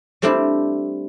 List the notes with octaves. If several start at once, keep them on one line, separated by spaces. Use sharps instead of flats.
G3 A3 C4 D4 E4